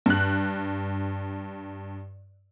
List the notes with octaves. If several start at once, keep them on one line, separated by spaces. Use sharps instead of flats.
G2 F#6